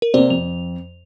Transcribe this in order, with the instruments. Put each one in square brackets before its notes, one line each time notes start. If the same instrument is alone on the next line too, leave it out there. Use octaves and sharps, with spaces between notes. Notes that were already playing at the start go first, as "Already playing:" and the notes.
[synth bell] A#4
[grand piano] C3 A#3 [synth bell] C5 D5
[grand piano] F2 [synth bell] F7